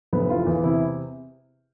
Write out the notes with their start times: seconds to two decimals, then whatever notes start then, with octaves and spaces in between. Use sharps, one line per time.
0.13 F1 B3
0.29 E3 F4
0.46 E2
0.63 C3 E4